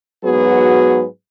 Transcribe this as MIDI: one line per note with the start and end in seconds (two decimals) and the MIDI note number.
0.24 1.05 44
0.24 1.05 54
0.24 1.05 59
0.24 1.05 66
0.24 1.05 68
0.24 1.05 71